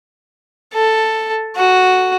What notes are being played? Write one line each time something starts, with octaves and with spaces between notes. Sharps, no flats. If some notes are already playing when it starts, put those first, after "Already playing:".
A4
F#4